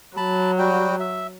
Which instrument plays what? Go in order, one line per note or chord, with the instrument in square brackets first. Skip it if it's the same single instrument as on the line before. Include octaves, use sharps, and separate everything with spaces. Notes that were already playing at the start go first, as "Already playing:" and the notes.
[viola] F#3 [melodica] A5 B5
[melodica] G3 F#4 G5
E5